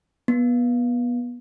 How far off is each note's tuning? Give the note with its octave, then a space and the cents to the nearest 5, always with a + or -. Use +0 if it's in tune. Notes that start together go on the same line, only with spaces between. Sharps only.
B3 -25